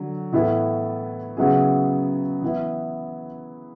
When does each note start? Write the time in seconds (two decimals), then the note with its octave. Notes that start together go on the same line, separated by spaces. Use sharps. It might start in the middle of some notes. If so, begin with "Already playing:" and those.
Already playing: D3 F#3
0.32 A2 E3 B3 E4 A4
1.37 C#3 F#3 B3 E4 G#4
2.42 E3 B3 E4